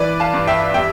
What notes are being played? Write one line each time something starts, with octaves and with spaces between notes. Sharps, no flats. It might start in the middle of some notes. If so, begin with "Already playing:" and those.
Already playing: E3 B4 D5
F5 A5
G2
E5 G5
G3 E5 G5